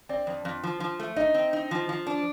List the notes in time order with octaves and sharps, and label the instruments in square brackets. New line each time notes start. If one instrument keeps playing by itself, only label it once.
[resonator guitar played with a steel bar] C4 [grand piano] D5
[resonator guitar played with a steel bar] F2
F2
F3
F3
A3
[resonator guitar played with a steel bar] D#4 [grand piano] D#5
[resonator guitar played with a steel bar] C4
D#4
F3
F3
D4